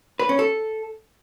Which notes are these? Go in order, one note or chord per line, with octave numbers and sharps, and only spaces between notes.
B4
C#4
A4